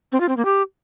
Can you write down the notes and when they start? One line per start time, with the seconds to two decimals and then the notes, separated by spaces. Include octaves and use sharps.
0.12 C4
0.20 F4
0.29 C4
0.37 A#3
0.45 G4